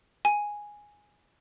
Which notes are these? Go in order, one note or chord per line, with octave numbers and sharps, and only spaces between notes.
G#5